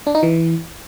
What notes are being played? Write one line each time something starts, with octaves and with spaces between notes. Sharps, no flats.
D4
D#4
E3